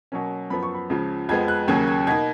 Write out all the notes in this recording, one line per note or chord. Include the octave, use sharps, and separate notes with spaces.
B2 F#3 A#3 C#4
F#2 F3 B3 B5
C#6
B5
C#2 C#3 F3
F2 F3 G#3 B3 G#6
F#6
D#2 C#3 F#3 A#3 C#4 G#6
G#6
B2 A#3 D#4 G#6